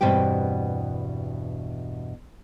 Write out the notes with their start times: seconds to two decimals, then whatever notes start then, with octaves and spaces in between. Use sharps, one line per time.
0.01 E2 G2 B2 C4 G4 G5